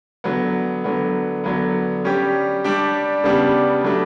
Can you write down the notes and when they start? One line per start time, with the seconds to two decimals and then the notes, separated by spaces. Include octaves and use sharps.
0.24 D3 F#3 B3
0.84 D3 F#3 B3
1.44 D3 F#3 B3
2.05 G3 C#4 G4
2.64 G3 D4 G4
3.24 C#3 G3 B3 D4 G4
3.84 F#3 A3 D4 G4